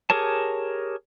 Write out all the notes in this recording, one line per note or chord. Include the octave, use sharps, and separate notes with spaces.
G4 G#4 A#4 C#5 A5